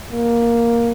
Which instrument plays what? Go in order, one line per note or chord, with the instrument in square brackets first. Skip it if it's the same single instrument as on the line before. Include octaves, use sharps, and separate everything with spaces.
[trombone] A#3